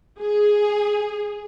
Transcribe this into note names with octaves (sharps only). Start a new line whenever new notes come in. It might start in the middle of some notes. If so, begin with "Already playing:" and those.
G#4